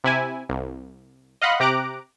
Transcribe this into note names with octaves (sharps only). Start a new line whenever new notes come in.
C3 E4 G#5
C2
D#5 F5 F#5 B5 C6 F#6
C3 G4 A#5 D6 F#6 D7